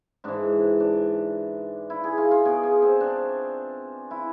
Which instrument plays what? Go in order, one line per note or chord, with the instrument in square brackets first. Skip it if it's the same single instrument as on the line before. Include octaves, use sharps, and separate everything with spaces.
[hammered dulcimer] G#2 E3 D4
D4
E4
G#4
F4
F4
B2 G#4
G#4
C4
D4
E4